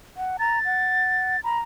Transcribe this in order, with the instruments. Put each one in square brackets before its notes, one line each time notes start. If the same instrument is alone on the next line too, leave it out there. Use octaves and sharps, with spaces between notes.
[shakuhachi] F#5
[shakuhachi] A#5 [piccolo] A6
[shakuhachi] F#5
[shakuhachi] A#5 [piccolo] B5